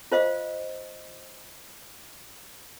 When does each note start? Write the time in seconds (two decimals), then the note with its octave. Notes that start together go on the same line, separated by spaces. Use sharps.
0.12 F4 C5 D#5 F5